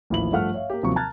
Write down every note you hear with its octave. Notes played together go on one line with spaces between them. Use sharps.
A1 D#2 F3 E4 B5 F#7
G2 F3 A3 F#5 F6
C#5 E5 F5
A#3 G4
D#2 C3 F3 F#3 C4 C#6
A5 A#5 F6 F#6 G#6 A6